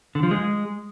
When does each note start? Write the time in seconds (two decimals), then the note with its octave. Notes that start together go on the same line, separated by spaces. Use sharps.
0.15 D3
0.23 F3
0.31 G#3